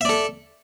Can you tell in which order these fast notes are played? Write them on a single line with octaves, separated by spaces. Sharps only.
E5 D5 A4